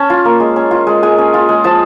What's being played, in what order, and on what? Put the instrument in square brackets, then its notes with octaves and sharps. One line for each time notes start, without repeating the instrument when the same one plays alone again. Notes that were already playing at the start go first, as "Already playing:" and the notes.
Already playing: [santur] C#4 A5
F4
A#3
G#3
C#4
F4
G#3
G#3 G#5
C#4
F4
G#3
F3 A5